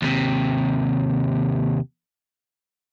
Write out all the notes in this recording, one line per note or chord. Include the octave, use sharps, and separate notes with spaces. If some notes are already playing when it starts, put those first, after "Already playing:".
D#2 C3